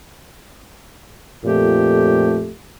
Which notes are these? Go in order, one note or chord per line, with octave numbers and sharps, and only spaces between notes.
F2 A#2 A3 G4